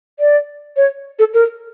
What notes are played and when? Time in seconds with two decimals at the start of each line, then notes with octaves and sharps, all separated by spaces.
0.19 D5
0.76 C#5
1.19 A4
1.34 A#4